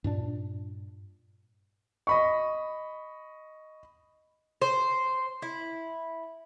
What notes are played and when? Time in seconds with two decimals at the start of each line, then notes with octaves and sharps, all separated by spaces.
0.04 G2 A#2 D4
2.07 D#5 B5 C#6
4.62 C5
5.42 E4